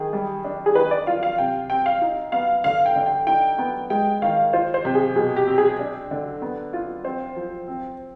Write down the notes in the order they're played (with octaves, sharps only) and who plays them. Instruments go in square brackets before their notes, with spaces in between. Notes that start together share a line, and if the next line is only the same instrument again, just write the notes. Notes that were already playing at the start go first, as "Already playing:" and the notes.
Already playing: [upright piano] D#3 [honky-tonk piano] G#4
[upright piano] G3
D4
[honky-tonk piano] G#4
[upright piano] D#3 [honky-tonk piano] B4
[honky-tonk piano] D5
[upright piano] F4 [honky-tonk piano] F5
[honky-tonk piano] F5
[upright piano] C3 [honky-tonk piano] G5
[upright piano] C4 [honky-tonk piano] G5
[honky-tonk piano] F5
[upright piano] D#4
[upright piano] B3 [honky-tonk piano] F5
[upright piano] D3 [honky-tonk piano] F5
[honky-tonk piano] G5
[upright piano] D3
[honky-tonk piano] G5
[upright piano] D#4 [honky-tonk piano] G5
[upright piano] B3
[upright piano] G#3 [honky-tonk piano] G5
[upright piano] D#3 [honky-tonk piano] F5
[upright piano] F4 [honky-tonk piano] C5
[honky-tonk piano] C5
[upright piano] C3
[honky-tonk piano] G#4
[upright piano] B2 [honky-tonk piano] G#4
[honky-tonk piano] G4
[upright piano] C4
[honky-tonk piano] G#4
[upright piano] D4
D3
B3
F4
[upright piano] C4 [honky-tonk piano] C5
[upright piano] F3
C4